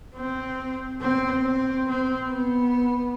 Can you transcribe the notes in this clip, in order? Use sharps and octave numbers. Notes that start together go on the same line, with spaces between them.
C4
C4
C4
C4
B3